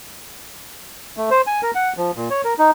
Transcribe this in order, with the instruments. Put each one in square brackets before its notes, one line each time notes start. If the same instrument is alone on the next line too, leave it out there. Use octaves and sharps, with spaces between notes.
[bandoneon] A3
C5
G#5
A#4
F#5
F3
A#2
C#5
A#4
D#4